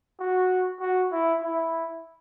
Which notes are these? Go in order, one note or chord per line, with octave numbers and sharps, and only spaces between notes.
F#4
F#4
E4
E4